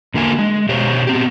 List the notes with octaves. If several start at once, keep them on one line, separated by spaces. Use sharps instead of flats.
E2 D3 A#3 F4 G#5
G#3
B2 G4 C5 C#5
B3 C4 G4